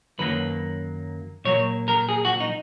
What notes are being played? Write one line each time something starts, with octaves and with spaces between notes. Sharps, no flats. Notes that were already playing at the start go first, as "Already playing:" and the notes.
F#2 D#3 F#3 A#3 B4
A#2 F#3 A#3 C#5
A#4
G#4
F#4
D#4